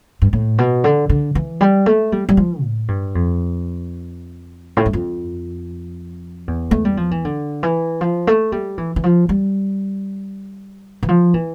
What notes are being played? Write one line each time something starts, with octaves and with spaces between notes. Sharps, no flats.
G2
A2
B2
D3
D3
E3
G3
A3
G3
G3
F3
A2
G2
F2
A2
G2
F2
E2
A3
G3
F3
E3
D3
E3
F3
A3
G3
E3
E3
F3
G3
E3
F3
E3